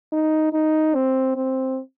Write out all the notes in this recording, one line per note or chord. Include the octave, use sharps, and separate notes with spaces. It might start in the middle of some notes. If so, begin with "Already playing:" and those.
D#4
D#4
C4
C4